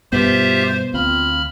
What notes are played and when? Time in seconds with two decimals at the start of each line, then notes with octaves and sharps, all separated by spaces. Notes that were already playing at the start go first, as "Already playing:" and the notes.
0.13 G2 B2 B3 F4 G4 C5 E5
0.94 D2 C4 F4 B5 F6